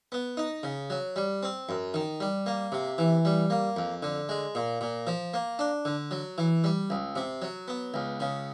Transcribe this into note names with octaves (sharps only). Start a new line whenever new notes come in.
B3
D#4
C#3
F#3
G3
C4
F#2
D#3
G3
A#3
C3
E3
G3
A#3
F2
D3
G#3
A#2
A#2
F3
A#3
D4
D3
F#3
E3
G3
C#2
C3
F#3
B3
C#2
C#3